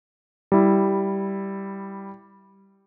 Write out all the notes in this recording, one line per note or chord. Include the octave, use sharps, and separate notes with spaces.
G3 E4